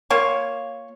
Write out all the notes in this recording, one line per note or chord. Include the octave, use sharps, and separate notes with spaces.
A#3 F4 C#5